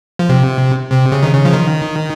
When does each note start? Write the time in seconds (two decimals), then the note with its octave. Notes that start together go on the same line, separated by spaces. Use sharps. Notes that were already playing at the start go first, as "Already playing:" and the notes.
0.19 F3
0.29 C3
0.92 C3
1.12 C#3
1.23 D#3
1.33 C#3
1.45 F3
1.53 D#3